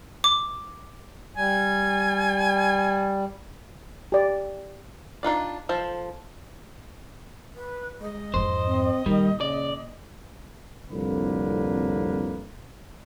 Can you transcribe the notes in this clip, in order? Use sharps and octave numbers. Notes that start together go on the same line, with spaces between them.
D6
G3 G#5
G4 D5
D4 D#4 F4 D5
F3 A4 C5
B4
G#3 D#5
F2 G#2 C5
C4
A#2 D#3 G3
C#3 D5
C2 F2 A2 D3 A#3 B4